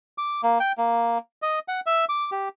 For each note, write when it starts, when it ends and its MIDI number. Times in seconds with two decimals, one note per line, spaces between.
0.18 0.41 86
0.43 0.58 58
0.60 0.72 79
0.78 1.18 58
1.42 1.59 75
1.68 1.80 78
1.86 2.05 76
2.09 2.30 86
2.32 2.49 67